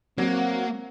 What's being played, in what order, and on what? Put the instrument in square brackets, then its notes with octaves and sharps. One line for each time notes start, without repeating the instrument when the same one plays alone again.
[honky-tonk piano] F#3 F#4 [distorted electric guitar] A#3 [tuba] C4